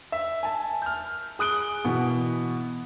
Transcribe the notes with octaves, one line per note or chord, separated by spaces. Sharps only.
E5
G#5 A5
F6 G6
G#4 D#6 F#6 D7 G7
B2 E3 B3